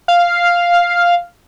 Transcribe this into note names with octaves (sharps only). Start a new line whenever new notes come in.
F5